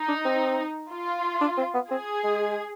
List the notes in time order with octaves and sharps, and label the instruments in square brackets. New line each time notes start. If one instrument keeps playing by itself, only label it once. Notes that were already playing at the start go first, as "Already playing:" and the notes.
Already playing: [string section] D#4
[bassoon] D4
C4
[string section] F4
[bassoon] D4
C4
B3
[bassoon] C4 [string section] G#4
[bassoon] G#3